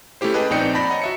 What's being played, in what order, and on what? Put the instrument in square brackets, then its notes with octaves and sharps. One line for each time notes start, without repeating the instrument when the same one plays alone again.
[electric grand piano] A3 C#4 E4 G4 C5
G#4 B4 D#5 G5 A5 B5
A#1 C4 D#4 D5 G5 C#7
D5 A5 B5 A#6
C#5 D#5 F#5 A#5
F#4 E5 C#7